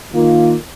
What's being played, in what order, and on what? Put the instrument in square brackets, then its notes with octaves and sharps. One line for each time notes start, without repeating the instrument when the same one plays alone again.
[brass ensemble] D#3 A#3 F4